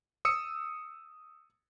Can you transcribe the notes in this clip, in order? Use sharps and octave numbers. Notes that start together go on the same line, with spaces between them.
D#6 E6 C#7